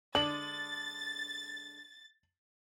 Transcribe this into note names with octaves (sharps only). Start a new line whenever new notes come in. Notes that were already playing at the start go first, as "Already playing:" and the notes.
D3 G#3 D4 A6 F#7